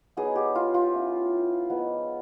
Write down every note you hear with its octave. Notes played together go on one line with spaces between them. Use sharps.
F#3 B3 D#4 G#4
G4
F4
F4
A3 C#4 E4
F3 G#3 B3 D#4